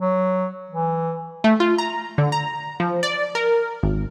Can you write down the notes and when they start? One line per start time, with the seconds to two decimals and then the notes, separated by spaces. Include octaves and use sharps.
0.01 F#3
0.70 E3
1.44 A3
1.60 F4
1.78 A#5
2.18 D3
2.32 A#5
2.80 F3
3.03 D5
3.35 A#4
3.83 G#1